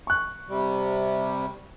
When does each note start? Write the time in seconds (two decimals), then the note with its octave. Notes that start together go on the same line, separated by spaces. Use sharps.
0.07 C#6 F#6
0.49 C3 G3